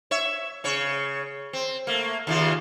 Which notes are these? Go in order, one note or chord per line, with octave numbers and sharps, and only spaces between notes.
C#5 E5
C#3 C#5
C4
A3 A#3
D#2 C#3 F4